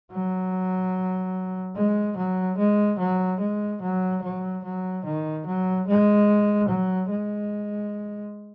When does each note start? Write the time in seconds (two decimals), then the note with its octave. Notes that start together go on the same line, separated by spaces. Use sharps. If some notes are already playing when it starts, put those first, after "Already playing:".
0.12 F#3
1.75 G#3
2.17 F#3
2.58 G#3
2.99 F#3
3.40 G#3
3.82 F#3
4.22 F#3
4.64 F#3
5.05 D#3
5.46 F#3
5.87 G#3
6.68 F#3
7.10 G#3